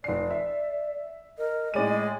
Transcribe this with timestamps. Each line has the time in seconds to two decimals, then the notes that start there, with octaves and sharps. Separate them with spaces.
0.04 F1 D5 C7
0.31 E5
1.38 A#4 D#5
1.74 A2 G#3 D5 D#7